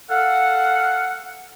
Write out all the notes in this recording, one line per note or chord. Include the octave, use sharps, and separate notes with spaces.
A4 F5 F#5